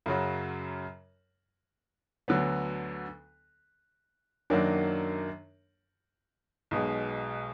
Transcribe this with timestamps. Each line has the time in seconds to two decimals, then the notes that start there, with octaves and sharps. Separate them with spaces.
0.06 F#2 C#3 F#3
2.28 D2 D3 F#3 B3
4.50 F#2 D#3 F#3 A#3 D4
6.71 B1 B2 G#3